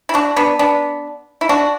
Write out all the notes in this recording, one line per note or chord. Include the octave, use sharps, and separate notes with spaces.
E4
D4 F#4
B3 D4
B3 D4
E4
D4 F#4